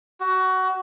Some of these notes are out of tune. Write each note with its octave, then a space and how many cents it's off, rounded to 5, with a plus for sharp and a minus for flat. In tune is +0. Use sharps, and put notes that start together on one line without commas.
F#4 +20